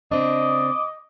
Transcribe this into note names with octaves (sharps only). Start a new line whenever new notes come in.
C#3 C4 D4 D#5 D6